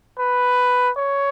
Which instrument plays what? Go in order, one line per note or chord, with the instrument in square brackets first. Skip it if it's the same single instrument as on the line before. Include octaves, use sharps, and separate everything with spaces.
[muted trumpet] B4
C#5